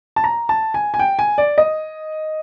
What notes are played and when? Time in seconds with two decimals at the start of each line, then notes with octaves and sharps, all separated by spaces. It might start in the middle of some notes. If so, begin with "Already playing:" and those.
0.16 A5
0.24 A#5
0.49 A5
0.74 G#5
0.94 G#5
0.99 G5
1.19 G#5
1.38 D5
1.58 D#5